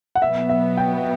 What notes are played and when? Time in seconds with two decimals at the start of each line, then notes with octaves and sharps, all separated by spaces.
0.15 F#5
0.22 B2 F#3 B3 E5
0.49 E5
0.77 G5